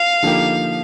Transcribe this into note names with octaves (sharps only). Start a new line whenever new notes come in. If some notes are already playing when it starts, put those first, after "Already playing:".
Already playing: F5
D3 F3 A#3 D#4 G4